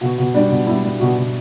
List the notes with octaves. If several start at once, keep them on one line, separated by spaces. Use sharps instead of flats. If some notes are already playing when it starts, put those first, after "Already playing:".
B2 F#4
B2
G3 D4
B2
G3 E4
G3
B2 F#4
B2